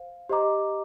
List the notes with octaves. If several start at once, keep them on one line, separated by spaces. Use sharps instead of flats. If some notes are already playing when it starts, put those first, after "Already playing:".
Already playing: C5 F5
G4 C5 D#5 A#5 D6